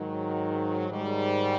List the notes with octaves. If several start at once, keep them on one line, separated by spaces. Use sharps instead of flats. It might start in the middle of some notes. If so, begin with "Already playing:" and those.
Already playing: G#2 D#3 F#3
G#2 D#3 G3